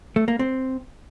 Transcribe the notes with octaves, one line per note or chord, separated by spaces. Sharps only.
A3
A#3
C4